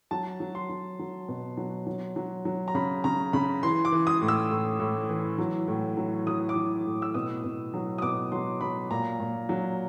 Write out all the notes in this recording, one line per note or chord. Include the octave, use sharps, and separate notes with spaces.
F#3 A5
F#3
C6
F#3
F#3
B2
F#3
F#3
F#3
F#3
A#5
C#3 B5
C#3 A#5
C#3 B5
E3 C6
D6
E3
D#6
A2
E6
A2
A2
E3
F#3
A2
F#3
F#3 D#6
D6
F#3
A2
E6
B2 D#6
B2
F#3
D#6
B2 D6
F#3 C6
F#3 B5
A#2 A#5
A#2
F#3